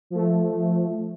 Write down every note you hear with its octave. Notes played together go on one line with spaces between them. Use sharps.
F3 A3